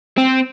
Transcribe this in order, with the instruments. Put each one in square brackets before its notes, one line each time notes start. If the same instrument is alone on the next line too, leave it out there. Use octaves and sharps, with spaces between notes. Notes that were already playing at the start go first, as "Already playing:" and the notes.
[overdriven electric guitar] C4